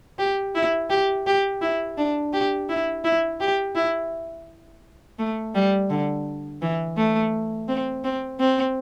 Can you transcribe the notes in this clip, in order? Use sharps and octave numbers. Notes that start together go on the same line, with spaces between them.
G4
E4
G4
G4
E4
D4
G4
E4
E4
G4
E4
A3
G3
D3
E3
A3
C4
C4
C4